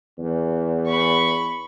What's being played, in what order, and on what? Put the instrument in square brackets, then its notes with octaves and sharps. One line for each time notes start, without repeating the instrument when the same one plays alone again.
[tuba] E2
[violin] B5 C#6